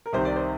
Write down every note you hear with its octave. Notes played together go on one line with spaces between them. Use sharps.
A#4
C2 C3 D#3 C5
D5
C5